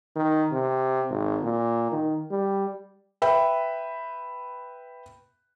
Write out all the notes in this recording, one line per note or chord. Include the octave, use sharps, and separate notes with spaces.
D#3
C3
G#1
A#2
D#3
G3
B4 E5 G5 B5